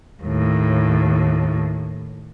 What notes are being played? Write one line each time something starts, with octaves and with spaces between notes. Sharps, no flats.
D#2 A2